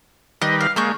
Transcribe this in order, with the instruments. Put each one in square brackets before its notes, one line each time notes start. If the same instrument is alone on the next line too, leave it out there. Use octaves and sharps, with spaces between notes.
[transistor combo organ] D#3 G3 B4 [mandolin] D#5
[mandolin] F5
[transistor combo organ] G#3 A#3 [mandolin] D4 C#6 G6